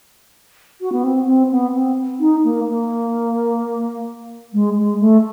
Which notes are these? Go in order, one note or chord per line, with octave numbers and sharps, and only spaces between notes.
F#4
B3
C4
C4
B3
C4
D#4
A#3
A#3
G#3
G#3
A3